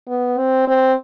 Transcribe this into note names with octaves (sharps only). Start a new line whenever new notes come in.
B3
C4
C4